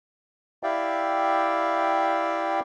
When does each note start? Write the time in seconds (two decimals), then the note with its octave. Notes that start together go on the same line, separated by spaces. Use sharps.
0.63 E4 G4 D5 E5 F5 G5